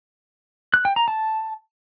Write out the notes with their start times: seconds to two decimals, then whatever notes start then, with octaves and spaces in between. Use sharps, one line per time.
0.74 F#6
0.85 G5
0.96 A#5
1.08 A5